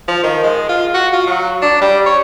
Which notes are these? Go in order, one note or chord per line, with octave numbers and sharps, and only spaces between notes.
F3
D#3
G#3
F4
F#4
F4
F#3
D4
G3
C#5